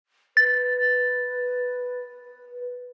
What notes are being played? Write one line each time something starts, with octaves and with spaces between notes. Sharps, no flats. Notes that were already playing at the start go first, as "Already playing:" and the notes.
B4 A6